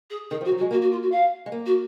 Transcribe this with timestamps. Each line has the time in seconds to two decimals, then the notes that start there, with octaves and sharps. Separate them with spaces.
0.10 G#4
0.30 D#3 G#4
0.41 F3 F#4
0.51 F#3
0.58 F#4
0.61 G#3
0.71 A#3 F#4
0.81 F#4
0.91 F4
1.02 F#4
1.11 F5
1.46 G#3
1.52 A#3
1.66 F#4